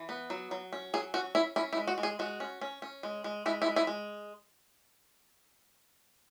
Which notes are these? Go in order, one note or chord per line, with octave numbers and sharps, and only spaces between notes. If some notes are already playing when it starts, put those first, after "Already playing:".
Already playing: E3
B3
F#3
F#3
C#4
F#3 G#4
C#4 F#4
C#4 E4
C#4 E4
E4
G#3
F#4
G#3
G#4
G#3 F#4
C#4
C#4
C#4
G#3
G#3
G#3 E4
E4
G#3
E4
G#3